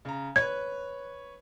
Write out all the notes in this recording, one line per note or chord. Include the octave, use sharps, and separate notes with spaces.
C#3 A#5
B4 C#5 G#6